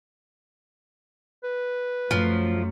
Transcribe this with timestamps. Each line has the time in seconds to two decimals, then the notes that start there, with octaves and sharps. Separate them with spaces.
1.43 B4
2.11 F#2 F3 A3